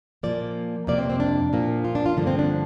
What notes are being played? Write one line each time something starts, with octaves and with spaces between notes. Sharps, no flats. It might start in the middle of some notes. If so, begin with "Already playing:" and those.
A#2 F3 A#3 D5
F2 C3 A#3 D5
C4
C4
D4
A#2 F3 A#3
F4
D4
F4
G2 D3 F3 A#3 D4
C4
D4